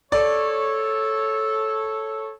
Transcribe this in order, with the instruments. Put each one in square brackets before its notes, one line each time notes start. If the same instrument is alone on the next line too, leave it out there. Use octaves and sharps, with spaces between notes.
[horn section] A4 C#5 [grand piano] D5